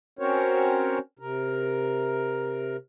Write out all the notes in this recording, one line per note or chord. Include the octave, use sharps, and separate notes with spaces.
C4 C#4 F#4 A#4 C5 C#5
C3 A#4